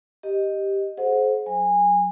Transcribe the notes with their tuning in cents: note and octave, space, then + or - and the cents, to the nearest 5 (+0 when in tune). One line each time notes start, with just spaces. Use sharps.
G4 +0 D#5 +0
G#4 +45 C5 +5 F#5 -20
F#3 +0 G#5 -20